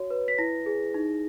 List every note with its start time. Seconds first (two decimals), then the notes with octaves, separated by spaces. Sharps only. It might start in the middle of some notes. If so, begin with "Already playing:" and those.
Already playing: F#4 C#5
0.10 B4
0.28 B6
0.38 E4 A#6
0.66 G#4
0.94 D#4